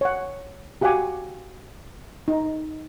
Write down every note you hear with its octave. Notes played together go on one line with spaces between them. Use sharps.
C#5 F#5
F#4 G4 F5 F#5 G#5 D6
D#4